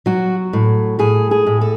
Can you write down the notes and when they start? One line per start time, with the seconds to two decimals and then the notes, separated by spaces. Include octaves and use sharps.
0.06 F#3 F#4
0.53 A2
0.99 A2 G#4
1.31 G#4
1.47 A2
1.61 A4